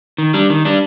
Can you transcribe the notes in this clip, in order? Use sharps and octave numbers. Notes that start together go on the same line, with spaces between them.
D#3
G3 D4
D#3
G3 D4